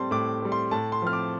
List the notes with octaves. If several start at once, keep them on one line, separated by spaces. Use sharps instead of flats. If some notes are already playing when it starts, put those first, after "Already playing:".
Already playing: A2 G3 C4 A5 C6
A2 D6
G3 C4
C6
A2 A5
C6
F3 C4 F6
D6